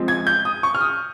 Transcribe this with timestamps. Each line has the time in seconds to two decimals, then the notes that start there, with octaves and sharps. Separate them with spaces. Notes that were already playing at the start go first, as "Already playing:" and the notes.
Already playing: F3 G#3 C4
0.08 G#6
0.27 G6
0.45 D#6
0.63 C#6
0.75 F6
0.81 D#6